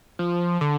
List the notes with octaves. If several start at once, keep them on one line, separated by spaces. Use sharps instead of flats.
F3
D3